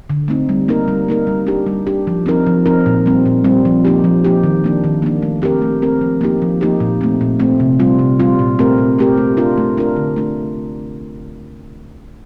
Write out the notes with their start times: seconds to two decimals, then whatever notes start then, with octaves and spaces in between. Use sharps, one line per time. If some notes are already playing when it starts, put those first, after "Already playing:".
0.10 D3
0.28 A3 C4 D#4
0.49 G3
0.68 A#3 D#4 A#4
0.88 G3
1.08 A#3 D#4 A#4
1.27 G3
1.47 D4 G4
1.67 G3
1.87 D4 G4
2.07 F3
2.26 C4 D#4 A#4
2.47 F3
2.66 C4 D#4 A#4
2.86 A#2
3.06 G3 C4
3.26 A#2
3.44 G3 C4
3.65 F3
3.85 A#3 D#4 G4
4.04 F3
4.24 A#3 D#4 G4
4.44 D#3
4.64 A#3 D4
4.84 D#3
5.02 A#3 D4
5.23 A3
5.42 C4 G4 A#4
5.62 A3
5.82 C4 G4 A#4
6.01 F3
6.21 A#3 D#4 G4
6.42 F3
6.61 A#3 D#4 G4
6.80 A#2
7.01 A3 C4
7.21 A#2
7.40 A3 C4
7.60 C3
7.80 G3 C4 F4
7.99 C3
8.20 G3 C4 F4
8.39 A#2
8.59 A3 C4 G4 A#4
8.78 A#2
8.99 A3 C4 G4 A#4
9.18 A3
9.37 D4 F4 A#4
9.58 A3
9.77 D4 F4 A#4
9.96 D3
10.16 A3 D4